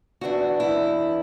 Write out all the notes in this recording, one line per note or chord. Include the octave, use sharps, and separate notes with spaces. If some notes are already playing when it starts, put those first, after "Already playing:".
E2 E3 D4 F#4
E4